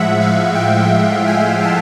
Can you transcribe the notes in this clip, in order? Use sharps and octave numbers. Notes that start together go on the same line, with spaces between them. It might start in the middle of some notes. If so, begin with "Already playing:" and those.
Already playing: A2 F3 G#3 E5 F#5
F5
G5
F#5
G5
G#5
A5